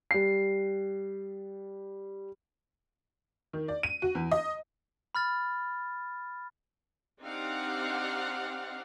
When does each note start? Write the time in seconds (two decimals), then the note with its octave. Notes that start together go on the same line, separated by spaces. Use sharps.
0.11 G3 C7
3.53 D#3
3.68 D5
3.83 D#7
4.02 F#4
4.15 E2
4.31 D#5
5.15 B5 F6 A6
7.22 C4 D4 D#4 G4 F5 F#5